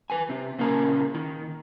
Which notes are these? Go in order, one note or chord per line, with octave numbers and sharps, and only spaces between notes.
B4 G#5
C3 C4
A#2 C#3 A#3 G#4 A#4
D#3